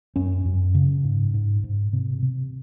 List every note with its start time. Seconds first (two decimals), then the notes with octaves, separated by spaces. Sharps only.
0.16 F#2 C#4
0.45 F#2
0.75 C#3
1.04 G#2
1.34 G#2
1.64 G#2
1.93 C3
2.22 C3